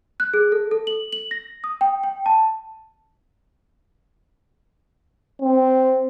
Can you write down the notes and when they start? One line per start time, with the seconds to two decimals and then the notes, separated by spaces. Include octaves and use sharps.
0.20 F#6
0.34 G#4
0.52 A4
0.71 A4
0.87 F#7
1.13 F#7
1.31 A#6
1.64 D#6
1.81 G5
2.03 G5
2.26 A5
5.42 C4